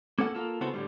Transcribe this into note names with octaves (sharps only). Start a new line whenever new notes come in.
A#3 C#4 A4 F#5
A#3 F4 A4
C#3 B3 E4 F#4 A4 C5
A2 D3 G3